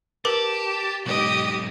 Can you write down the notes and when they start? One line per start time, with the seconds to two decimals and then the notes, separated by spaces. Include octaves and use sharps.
0.25 G4 A#4 B4 A5 D6
1.06 B1 G#2 G4 D#5